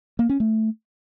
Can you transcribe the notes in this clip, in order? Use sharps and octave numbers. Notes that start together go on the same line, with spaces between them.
A#3
C#4
A3